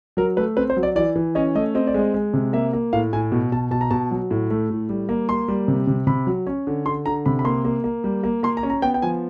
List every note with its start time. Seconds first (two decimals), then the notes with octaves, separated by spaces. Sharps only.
0.17 F#3 A#4
0.37 A3 B4
0.57 C4 B4
0.70 C5
0.77 F#3
0.83 D5
0.96 E3 D5
1.15 E3
1.35 C#4 D#5
1.55 A3 D#5
1.75 C4 D#5
1.87 D5
1.94 G#3 D#5
2.14 G#3
2.34 C3
2.53 A#3 E5
2.73 A#3
2.93 A2 F5
3.13 A2 G#5
3.32 B2
3.52 B2 A5
3.71 B2 A5
3.81 A#5
3.91 B2 A5
4.11 F#3
4.31 A2
4.51 A3
4.70 A2
4.89 G3
5.09 A#3
5.29 A#3 C6
5.48 G3
5.68 C3
5.87 C3
6.07 C3 B5
6.27 F#3
6.47 C#4
6.67 D3
6.86 D3 C6
7.06 D3 A#5
7.26 C3 B5
7.39 B5
7.45 A#3 C6
7.65 A#3
7.84 A#3
8.04 G3
8.23 A#3
8.43 A#3 C6
8.57 A#5
8.63 C#4
8.70 A#5
8.82 B3 G5
8.94 G5
9.02 F3 G#5